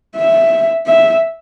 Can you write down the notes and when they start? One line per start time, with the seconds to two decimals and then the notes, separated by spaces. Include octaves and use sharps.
0.16 E5
0.87 E5